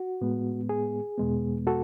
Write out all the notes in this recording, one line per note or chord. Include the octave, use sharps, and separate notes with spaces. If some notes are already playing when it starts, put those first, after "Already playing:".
Already playing: F#4
A2 G#3 B3
G#4
E2 B2 G#3 B3
F#4 A4